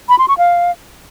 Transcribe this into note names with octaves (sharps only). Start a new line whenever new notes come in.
B5
C6
C#6
F5